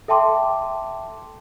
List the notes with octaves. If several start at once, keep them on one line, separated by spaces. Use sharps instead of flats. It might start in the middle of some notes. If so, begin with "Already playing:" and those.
A4 E5 G5 A5 C6 D6